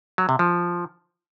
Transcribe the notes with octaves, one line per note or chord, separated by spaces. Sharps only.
F#3
C3
F3